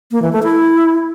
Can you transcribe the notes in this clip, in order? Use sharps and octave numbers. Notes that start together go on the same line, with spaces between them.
A#3
E3
A3
E4